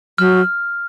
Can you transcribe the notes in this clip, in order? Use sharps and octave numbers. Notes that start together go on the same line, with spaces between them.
F#3 F6